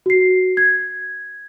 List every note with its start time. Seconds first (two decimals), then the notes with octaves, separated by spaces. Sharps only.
0.06 F#4 C7
0.57 G#6